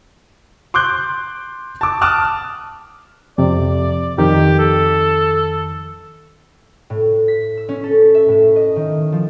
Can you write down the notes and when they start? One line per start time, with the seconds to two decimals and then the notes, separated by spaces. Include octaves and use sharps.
0.74 C6 D6 F#6 G6
1.81 A5 D6
2.01 A5 D6 D#6 F6 F#6
3.38 F2 C3 D5
4.18 F2 D#3 G4
4.59 A4
6.90 A2
7.28 B6
7.57 E6
7.69 C#4
7.84 A4
8.15 E5
8.28 A2
8.56 D#5
8.76 D#3
9.12 F3